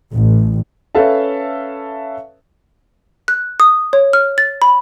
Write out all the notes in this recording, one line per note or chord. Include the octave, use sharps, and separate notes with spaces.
A1
C#4 A4 B4 E5 F5 A5
F#6
D#6
C#5
F6
A6
B5